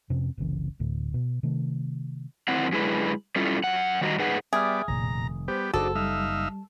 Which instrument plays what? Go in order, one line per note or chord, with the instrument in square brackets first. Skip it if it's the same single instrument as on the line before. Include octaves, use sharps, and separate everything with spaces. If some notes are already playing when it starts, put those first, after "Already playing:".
[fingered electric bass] F2 C3 C4 C#4
F#1 C2 C#3 E3
D1 D2 A2
B2
C3 D#3 A3
[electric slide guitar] F#2 D#3 C4 E4 F#5
F#2 D3 G#3 E4 B4
G3 C#4 E4 F4 A4
F#2 F#5
D#3 G3 F#4 D5 D#5 A#5
G#2 D#4 G#4 B4 F#5
[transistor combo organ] G3 B3 D5 [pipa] G#4 [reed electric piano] E5 G5 F6
[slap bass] F1 D#3 [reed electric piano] C2 A#2 [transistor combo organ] A#5
[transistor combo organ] G3 B3 G4 [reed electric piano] C5
[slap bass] F#1 [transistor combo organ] D4 D#4 [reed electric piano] F#4 G#4 C5 [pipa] A4
[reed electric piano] G3 [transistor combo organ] D#4 E5 F5